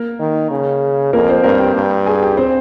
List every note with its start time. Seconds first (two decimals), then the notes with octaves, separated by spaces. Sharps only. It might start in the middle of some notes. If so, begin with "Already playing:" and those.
Already playing: A#3 A#4
0.20 D#3
0.51 C#3
1.13 F2 A#3 A#4
1.29 C4 C5
1.44 G2 A#3 A#4
1.59 G4 G5
1.75 G2
2.06 G#4 G#5
2.22 G4 G5
2.37 C4 C5